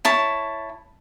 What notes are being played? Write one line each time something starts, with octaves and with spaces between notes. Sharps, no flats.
E4 C#5 A5